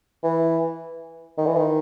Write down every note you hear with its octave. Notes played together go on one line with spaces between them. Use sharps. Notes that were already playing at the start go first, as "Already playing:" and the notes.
E3
D#3
E3
D#3